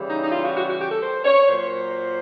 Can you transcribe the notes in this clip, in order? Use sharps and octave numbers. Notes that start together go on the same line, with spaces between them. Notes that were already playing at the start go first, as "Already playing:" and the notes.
Already playing: C#3 E3 G3
D#4
D#4
F4
F#4
F#4
F#4
G4
A4
C5
C#5
A#2 F#3 C5